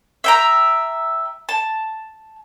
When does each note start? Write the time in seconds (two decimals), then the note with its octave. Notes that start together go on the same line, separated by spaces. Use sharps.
0.24 E5 G5 A#5
1.49 A5